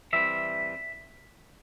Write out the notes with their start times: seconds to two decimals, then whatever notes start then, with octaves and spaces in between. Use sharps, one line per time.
0.13 E3 G3 C4 E5